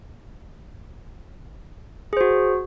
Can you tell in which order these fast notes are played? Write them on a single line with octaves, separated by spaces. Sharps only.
G#4 C5 F#4